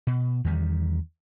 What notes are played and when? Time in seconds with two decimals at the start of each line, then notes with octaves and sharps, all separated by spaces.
0.07 B2
0.44 E2 D#3 G3